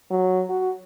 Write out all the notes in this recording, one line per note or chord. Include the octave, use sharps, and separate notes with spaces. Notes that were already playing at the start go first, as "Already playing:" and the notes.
F#3
F#4